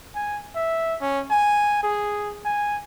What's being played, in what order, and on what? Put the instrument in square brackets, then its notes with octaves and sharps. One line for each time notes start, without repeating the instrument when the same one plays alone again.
[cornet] G#5
E5
C#4
G#5
G#4
G#5